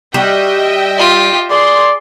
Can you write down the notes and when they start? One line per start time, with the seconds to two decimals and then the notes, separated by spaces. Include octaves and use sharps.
0.14 G3 F#4 D#5 E5 G5
0.98 F4 G4
1.50 G#4 D5 C6